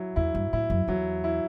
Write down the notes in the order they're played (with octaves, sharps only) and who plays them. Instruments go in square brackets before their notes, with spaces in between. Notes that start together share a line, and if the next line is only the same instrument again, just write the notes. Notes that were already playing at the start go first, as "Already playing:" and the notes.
Already playing: [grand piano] F#3 E4
[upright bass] E2 [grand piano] E4
[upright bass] G2
[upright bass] A2 [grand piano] E4
[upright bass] F#2
[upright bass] E2 [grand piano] F#3
[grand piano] E4